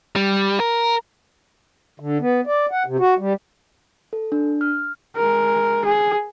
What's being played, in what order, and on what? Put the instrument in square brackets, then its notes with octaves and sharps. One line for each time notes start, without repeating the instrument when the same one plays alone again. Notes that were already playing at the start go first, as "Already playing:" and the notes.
[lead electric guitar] G3
A#4
[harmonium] D3
B3
D5
F#5
C3
F#4
G3
[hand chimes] A4
D4
F6
[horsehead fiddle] G#3 A#4
G#4